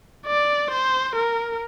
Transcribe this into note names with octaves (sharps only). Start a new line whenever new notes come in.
D5
C5
A#4